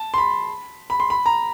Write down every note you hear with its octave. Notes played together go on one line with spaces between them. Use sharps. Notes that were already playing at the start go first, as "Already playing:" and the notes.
Already playing: A5
C6
B5
B5
C6
B5
A#5